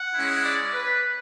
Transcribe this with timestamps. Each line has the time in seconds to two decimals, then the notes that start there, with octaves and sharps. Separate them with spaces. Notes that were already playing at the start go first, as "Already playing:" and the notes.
Already playing: F#5
0.14 G#3 C#4 E4
0.44 D5
0.74 B4